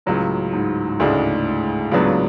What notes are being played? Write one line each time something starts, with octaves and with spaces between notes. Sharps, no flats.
C#2 A2 C#3 F#3
G#2
G#2
D2 A2 C#3 G#3 D4
C#2 C#3 F#3 B3 D4